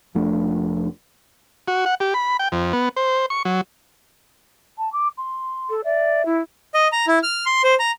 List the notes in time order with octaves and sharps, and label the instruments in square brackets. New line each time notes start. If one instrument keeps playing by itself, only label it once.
[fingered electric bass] F1 F3 A3 D4
[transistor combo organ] F#4
F#5
G4
B5
G5
F2
B3
C5
C#6
F#3
[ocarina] A5
D6
C6
[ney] A4
[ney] D5 [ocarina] E5
[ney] E4
[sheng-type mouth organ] D#5
A#5
E4
F6
C6
C5
A#5